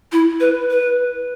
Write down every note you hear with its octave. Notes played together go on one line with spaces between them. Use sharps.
E4
B4
B4